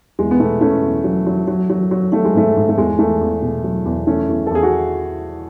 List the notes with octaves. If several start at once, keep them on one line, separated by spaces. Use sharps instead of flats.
E2 G#3
B3
B2 A3
B2 A3 C#4
E2
F#3
F#3
F#3
F#3
F#3
F#3 A3
G#3
G#2 A3
G#2
A3
E2 G#3
E2 A3
E2
B2
F#3
E2
E3 A3 C#4
E2
A4
E2 G#4
F#4